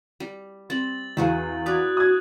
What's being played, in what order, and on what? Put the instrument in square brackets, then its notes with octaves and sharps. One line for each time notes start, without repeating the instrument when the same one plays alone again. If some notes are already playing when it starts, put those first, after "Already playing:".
[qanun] G3
[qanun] G3 C4 [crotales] A6 F#7
[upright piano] E2 F5 [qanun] E4 F#4 G#4
[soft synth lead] F#4 [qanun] B4 D5 [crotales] D#6 F#6 G#6
[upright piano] D#6 G#6 [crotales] F#6